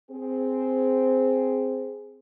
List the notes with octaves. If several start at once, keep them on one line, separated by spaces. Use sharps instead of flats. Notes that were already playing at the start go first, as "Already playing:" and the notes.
C4 G#4